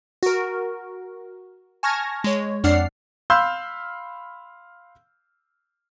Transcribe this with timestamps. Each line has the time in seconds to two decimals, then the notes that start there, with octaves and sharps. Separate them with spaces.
0.23 F#4 A#4
1.83 G#5 A5 C#6 F6 G#6 A#6
2.24 G#3 C#5
2.64 F2 D4 D5 F#5 F6 C7
3.30 F5 B5 C6 E6 F6 G6